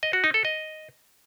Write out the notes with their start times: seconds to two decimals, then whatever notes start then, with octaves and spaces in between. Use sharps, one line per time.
0.03 D#5
0.13 F#4
0.24 D#4
0.34 A4
0.45 D#5